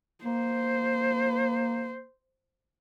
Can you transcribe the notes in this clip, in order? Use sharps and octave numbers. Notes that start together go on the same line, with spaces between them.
A#3 C5